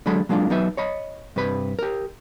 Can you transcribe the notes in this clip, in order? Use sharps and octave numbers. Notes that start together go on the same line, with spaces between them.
D3 F#3 G#3 A4 B5
F#3 G#3 A#3 D4 F4
F#3 B3 D#4 B4 E5
C#5 D#5 B5
G2 C3 B4 B5
G4 A#4